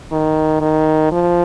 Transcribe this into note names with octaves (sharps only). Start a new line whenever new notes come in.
D#3
D#3
F3